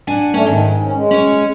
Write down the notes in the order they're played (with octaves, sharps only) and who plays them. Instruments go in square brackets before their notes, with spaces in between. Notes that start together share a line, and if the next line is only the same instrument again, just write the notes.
[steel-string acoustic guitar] D4 F#5 G#5
[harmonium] A3 D4 [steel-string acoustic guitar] C#4 C#5
[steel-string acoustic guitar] G#2 [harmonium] D#3
[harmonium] C#4
G#3
[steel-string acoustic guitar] C#4 C#5